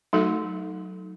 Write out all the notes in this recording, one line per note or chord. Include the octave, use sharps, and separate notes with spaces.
F#3 A3 D#4 F#4 A4